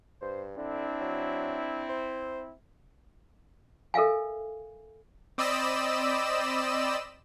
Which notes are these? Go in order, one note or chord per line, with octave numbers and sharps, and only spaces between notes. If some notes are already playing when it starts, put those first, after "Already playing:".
G2 C5
D3 C4 D4 E4
F#3
C5
A4 A#4 E5 F5 G#5
C4 D5 D#5 B5 E6 E7